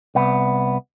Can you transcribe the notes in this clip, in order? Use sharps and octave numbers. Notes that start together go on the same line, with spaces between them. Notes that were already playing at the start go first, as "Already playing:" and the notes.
C2 B3